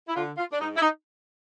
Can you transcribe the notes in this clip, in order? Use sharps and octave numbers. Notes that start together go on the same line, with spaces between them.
E4
D3 F4
F4
D4
G#2 D#4
E4
D#4